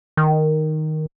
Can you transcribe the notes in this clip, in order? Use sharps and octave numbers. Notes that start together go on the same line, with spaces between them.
D#3